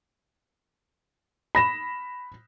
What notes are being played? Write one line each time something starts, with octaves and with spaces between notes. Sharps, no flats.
B5 A#6 E7